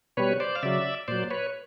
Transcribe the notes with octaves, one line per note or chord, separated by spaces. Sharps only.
B2 G3 B4 C#5
C5 D5
F5
C#3 F#3 D5 E5
A#2 F#3 C5 D5
B4 C#5